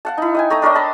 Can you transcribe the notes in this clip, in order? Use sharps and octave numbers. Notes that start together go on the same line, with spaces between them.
F5 F#5 A5
D#4 E4
D#5 G5 G#5
A3 A#5 D#6 E6
D4 A#4 C#5 D#5
A5 B5 C6